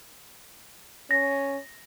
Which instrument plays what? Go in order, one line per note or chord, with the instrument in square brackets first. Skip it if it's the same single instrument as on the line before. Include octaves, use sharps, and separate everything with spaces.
[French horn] C#4 [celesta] A#6